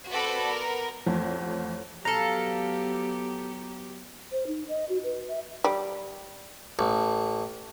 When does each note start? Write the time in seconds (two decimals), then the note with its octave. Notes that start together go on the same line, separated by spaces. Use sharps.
0.11 C4 F#4 A4 B4 D5 B5
0.46 B3 A#4
1.06 A1 F2 F3
2.05 F#3 B3 G4 A4 F5 A#5
4.32 C5
4.47 D#4
4.69 D#5
4.89 F#4
5.04 B4
5.28 E5
5.64 G3
6.79 A1